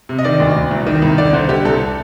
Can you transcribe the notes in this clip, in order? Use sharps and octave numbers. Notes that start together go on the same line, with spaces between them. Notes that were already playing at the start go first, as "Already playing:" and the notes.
C3
D#5
D#3 D5
D2
D2
C2
D#3
C2
D3 D5
D3 C5
D3 G4
C2 A4